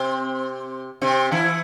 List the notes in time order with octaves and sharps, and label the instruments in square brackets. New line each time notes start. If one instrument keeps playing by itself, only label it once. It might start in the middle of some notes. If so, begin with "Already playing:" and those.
Already playing: [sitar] C3 C4
C3 C4
E3 E4